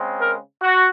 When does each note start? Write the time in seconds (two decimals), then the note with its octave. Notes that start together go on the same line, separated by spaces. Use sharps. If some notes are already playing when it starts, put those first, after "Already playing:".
Already playing: C#3 G#3 C4
0.21 A#4
0.62 F#4